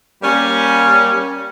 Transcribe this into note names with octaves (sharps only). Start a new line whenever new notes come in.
G3 A#3 C#4